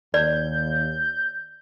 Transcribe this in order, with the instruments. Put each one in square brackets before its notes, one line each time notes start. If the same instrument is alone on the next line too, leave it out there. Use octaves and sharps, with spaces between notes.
[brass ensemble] D#2 [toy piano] D5 [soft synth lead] G6